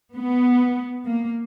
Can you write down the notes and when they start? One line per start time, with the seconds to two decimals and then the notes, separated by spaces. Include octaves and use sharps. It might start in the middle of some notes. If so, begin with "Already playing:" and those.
0.15 B3
1.06 A#3